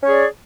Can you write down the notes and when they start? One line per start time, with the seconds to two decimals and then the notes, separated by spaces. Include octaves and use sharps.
0.02 C#4
0.05 C#5
0.07 G#4
0.10 D5